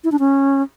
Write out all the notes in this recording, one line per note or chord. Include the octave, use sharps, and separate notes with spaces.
E4
D4
C#4